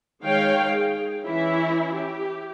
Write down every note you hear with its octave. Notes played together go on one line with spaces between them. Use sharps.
D#3 G#3 C#5 F5 G5
G#4
E3 C#4 E4 E5
G4